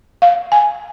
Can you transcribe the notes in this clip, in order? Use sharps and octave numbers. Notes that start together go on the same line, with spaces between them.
F5
G#5